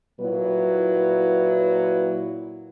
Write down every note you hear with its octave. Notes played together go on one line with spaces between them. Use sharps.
A#2 F#3 E4 B4